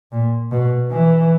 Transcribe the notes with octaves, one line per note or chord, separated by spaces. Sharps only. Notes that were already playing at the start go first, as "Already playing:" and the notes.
A#2
B2
E3